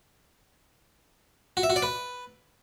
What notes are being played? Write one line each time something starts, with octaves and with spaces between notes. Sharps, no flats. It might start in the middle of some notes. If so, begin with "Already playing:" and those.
F#4
E5
F#4
D5
B4